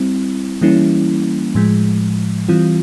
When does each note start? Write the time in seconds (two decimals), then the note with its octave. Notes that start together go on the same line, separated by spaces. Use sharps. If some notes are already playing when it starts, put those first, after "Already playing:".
Already playing: G3 C4 E4
0.61 E3 G3 A#3 C#4 E4
1.55 A2 F3 G#3
2.48 E3 G3 C4 F4